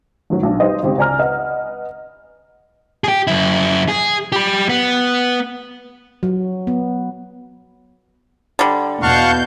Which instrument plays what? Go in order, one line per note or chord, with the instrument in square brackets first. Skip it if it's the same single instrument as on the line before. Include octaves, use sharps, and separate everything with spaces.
[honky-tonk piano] A1 D#3 F#3
B1 D4
G3 D#4 G4 B4 C5 D#5
G#1 C#3 C4 G4
C#2 D5 G#5 A#5 F6
B4 D#5 F#5
[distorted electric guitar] G4 G#4
F#2 E4
G#4
G4 B5
B3
[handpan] F#3
B3
[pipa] D3 G3
[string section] E2 B2 G6 [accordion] F5 F#5 C#6 [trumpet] A5